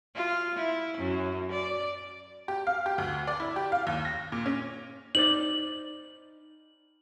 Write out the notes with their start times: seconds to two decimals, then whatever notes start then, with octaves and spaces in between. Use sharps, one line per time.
0.15 F4
0.55 E4
0.98 F#2
1.52 D5
2.48 G4
2.67 F5
2.86 G4
2.98 D2
3.27 D5
3.40 E4
3.56 G4
3.72 F5
3.87 D#2
4.05 A#6
4.32 A#2
4.46 C#4
5.15 D#4 C5 D5 F#7